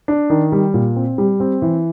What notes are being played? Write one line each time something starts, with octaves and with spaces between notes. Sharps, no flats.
D4
D#3
G3
A#2
C4
G3
C4
E3